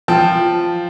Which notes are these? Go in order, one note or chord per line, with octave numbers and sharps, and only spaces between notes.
F3 G5 A5